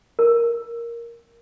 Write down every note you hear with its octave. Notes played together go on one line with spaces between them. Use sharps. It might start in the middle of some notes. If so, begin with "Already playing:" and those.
A#4